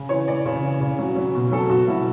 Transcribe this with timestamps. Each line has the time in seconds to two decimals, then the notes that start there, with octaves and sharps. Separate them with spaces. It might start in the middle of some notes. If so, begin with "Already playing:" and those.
Already playing: C#3
0.09 E3 C#5
0.28 E3 D5
0.45 C#3 C#5
0.63 E3
0.80 C#3
0.99 F#3
1.16 F#3
1.35 B2
1.52 F#3 A4
1.70 B2 F#4
1.88 F#3 E4